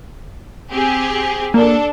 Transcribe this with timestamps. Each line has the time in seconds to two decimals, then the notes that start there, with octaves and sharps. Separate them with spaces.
0.71 C4 G4 G#4
1.54 A#3 D4 A4